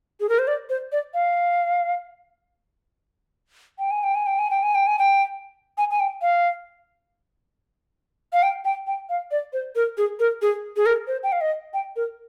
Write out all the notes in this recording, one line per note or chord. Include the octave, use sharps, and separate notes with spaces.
G#4
A#4
C5
D5
C5
D5
F5
G5
G#5
G5
G#5
G5
G#5
G5
G#5
G5
G#5
G5
G#5
G#5
G5
F5
F5
G5
G5
G5
F5
D5
C5
A#4
G#4
A#4
G#4
G#4
A#4
C5
G5
F5
D#5
G5
A#4